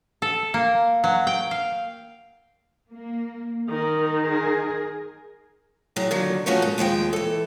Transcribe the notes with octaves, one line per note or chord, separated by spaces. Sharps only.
A4
A#3
F#3
G5
F5
A#3
D#3 A#4
G#4 A#4
A2 F#3 G#4 A#5
A#2 D3 D#3 F#3
D#3 F3 A3 C#4 F#4 A#4
G#2
D#2 F3 G#3 G5
E3 A4